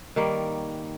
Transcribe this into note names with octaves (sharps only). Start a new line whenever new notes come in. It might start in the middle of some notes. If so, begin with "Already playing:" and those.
D#3 G3 A#3